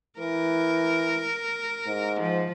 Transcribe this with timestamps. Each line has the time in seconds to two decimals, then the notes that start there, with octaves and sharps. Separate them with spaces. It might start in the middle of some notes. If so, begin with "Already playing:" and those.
0.19 E3 A#4
1.87 G#2
2.20 F3